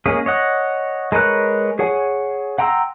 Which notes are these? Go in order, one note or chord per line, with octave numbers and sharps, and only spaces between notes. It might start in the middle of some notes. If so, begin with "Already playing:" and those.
G#3 A#3 C#4 G#4
C#5 D#5 F#5
G#3 A#4 B4 C#5 F#6
G#4 C#5 F#5 G#5
F#5 G5 A#5 C6 E6